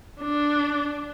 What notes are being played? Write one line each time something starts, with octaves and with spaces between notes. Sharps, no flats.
D4